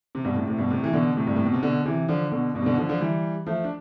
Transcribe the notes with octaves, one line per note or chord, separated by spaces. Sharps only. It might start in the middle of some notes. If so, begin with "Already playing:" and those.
C3
G2 B2
A2 C3
A2 C3
G2 B2
A2 C3
E3
B2 D3
A2 C3
G2
A2
B2
C3
B2 D3
C3 E3
D3 F3
B2 D3
G2 B2
C3
B2 D3
D3 F3
D3 F3
E3 G3
F3 A3
D4